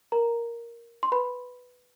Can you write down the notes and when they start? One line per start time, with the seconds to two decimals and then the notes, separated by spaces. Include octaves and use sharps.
0.12 A#4 A#5
1.03 C6
1.12 B4 B5